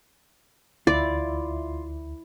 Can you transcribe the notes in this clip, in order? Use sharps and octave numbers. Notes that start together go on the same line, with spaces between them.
D2 E4 F4 D5